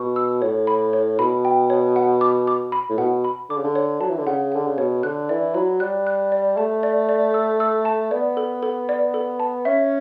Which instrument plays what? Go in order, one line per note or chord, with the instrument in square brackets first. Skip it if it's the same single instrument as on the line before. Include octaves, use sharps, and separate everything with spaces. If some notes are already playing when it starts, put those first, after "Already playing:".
Already playing: [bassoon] B2 [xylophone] C#6
[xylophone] E6
[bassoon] A2 [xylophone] C#5
[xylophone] B5
C#5
[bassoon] B2 [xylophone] B5
[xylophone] G5
C#5
F#5
D6
D6
B5
[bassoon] A2
[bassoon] B2 [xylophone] F#5
[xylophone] B5
[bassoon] D3 [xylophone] D6
[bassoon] C#3
D3
[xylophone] C#5
[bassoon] F#3 [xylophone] A5
[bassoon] E3
D3
[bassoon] C#3 [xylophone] F#5
[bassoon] D3 [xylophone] F#5
[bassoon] C#3
[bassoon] B2 [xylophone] C#5
[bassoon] D3 [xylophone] F#6
[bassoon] E3 [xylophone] D5
[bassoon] F#3 [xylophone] B5
[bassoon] G3 [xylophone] F#6
[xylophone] F#6
D5
[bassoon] A3 [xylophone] A5
[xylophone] D5
D5
E6
E6
A5
[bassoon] B3 [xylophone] D5
[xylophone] A4
A4
D5
A4
A5
[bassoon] C#4 [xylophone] E5